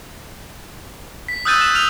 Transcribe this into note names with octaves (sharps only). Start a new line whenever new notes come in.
B6
D#6 E6 F#6 G6 A6 D#7
E7
D#6 F6 F7